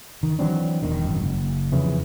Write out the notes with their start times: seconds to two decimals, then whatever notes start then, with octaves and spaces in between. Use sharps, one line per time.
0.23 D#3
0.39 E3 F#3 C4 D4
0.82 E1 D#3
1.04 G#1 F#2
1.22 F#1
1.72 F2 C#3 E3